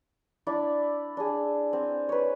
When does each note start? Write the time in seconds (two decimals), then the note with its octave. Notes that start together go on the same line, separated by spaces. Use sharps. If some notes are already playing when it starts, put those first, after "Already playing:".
0.47 D4 E4 D5
1.17 D4 G#4
1.73 C4
2.09 B4 C#5